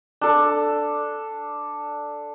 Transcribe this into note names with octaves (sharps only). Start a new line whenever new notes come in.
D4 A4